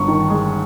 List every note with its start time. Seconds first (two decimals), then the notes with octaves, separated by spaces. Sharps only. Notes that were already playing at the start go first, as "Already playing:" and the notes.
Already playing: G1 G2 C#6
0.08 D#3
0.30 G#3